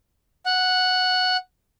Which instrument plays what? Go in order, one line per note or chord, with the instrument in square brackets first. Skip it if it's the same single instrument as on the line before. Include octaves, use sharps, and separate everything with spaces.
[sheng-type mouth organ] F#5